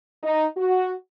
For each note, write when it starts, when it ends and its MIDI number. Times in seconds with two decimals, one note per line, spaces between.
0.23 0.45 63
0.57 0.93 66